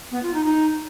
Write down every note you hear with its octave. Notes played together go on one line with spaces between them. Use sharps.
B3
F4
D#4
D#4